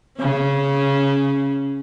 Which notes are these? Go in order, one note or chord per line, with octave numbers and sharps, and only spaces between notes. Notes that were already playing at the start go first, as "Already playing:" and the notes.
C#3 C#4